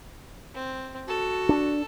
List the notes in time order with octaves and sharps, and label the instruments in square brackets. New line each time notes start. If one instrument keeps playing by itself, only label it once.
[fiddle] C4
[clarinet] F#4 [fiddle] A4
[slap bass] D4